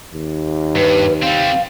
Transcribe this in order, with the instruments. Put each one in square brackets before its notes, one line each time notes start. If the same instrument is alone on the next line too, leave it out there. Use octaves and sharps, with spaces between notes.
[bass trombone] D#2
[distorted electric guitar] G2 [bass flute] B4
[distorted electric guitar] G3 C4 [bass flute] F5